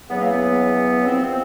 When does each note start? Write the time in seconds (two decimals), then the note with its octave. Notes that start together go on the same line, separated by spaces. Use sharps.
0.09 E2 C#3 F#3 B3
0.19 A#3
0.31 B3
1.06 G#2 F3 C4
1.23 C4